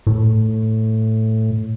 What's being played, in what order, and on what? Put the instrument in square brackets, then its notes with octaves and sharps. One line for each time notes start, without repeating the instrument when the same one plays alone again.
[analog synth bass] A2